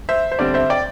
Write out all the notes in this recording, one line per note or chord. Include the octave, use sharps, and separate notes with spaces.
C5 E5
C5
D3 G3 C4 D5
C5 E5
D5 G5